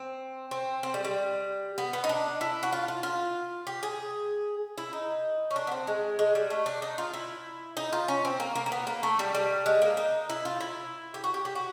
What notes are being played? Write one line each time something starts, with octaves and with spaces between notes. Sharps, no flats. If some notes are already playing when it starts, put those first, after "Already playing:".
Already playing: C4
C4
C4
G3
G3
B3
B3
D#4
D4
E4
F#4
F4
F4
F4
G4
G#4
E4
D#4
C#4
D4
B3
C4
G#3
G#3
G3
A3
D4
D#4
F4
E4
D#4
F4
C#4
C4
A#3
A#3
A#3
B3
A#3
A3
G3
G3
G#3
A#3
D#4
E4
F4
E4
G4
F#4
G4
G4
F#4